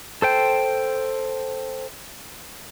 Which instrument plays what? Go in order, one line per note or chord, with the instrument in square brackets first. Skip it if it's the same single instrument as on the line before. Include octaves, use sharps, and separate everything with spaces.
[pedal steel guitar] A4 C5 G5